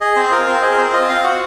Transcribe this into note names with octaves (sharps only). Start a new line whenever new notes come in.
G#4 D#5
C4 C5
F4 A#4
C4 C5
G#4 D#5
A#4
C4 C5
F4 D#5
C4 F5
F#4 F#5